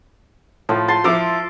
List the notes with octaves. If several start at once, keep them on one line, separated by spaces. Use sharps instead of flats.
A2 F3
A5 C6
F3 E4 A4 D6